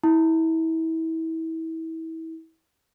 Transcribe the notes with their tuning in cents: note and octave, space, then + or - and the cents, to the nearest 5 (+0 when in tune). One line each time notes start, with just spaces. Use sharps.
E4 -30